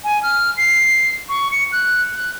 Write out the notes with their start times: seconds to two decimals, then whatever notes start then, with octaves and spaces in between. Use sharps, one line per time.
0.04 G#5
0.23 F6
0.57 C7
1.29 C#6
1.51 C#7
1.72 F#6
2.16 F#6